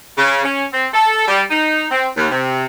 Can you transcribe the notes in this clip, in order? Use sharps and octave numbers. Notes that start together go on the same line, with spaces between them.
C#3
C#4
C4
A4
G3
D#4
C4
D#2
C3